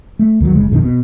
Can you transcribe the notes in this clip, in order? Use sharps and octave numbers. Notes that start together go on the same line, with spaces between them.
A3
D#2 D#3 F3 F#3
F#1 C#3 G#3
A#1 F2 C3 D#3
B2